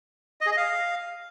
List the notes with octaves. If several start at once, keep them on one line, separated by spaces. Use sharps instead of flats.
D#5
G#4
D#5
F5